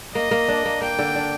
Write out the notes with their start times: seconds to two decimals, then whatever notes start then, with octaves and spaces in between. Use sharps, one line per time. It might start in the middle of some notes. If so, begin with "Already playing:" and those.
0.14 A#3 D#5
0.31 A#3
0.48 D4
0.65 A#3
0.81 A#3 G5
0.99 D3
1.15 D4